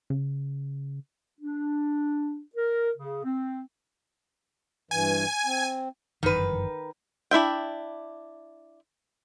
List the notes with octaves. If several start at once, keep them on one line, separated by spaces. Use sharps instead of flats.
C#3
D4
A#4
C#3
C4
G2 E3 G#5
C4
G1 F#2 D#3 E3 B4
D4 E4 E5 G5